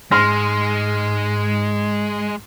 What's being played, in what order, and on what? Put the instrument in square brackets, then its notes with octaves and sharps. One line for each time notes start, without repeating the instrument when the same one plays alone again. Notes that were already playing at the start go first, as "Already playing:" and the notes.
[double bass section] G#2 [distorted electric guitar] G#3 [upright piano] C6 F6 A#6